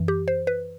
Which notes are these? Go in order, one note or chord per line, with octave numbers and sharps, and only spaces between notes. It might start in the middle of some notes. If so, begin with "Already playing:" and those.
Already playing: F#2 E3
G4
C5
B4